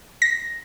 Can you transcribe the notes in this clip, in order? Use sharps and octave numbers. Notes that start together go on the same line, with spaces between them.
A#6